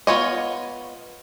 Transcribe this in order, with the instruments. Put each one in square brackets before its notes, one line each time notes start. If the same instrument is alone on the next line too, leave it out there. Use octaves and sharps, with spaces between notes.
[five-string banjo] B3 F4 C#5 D#5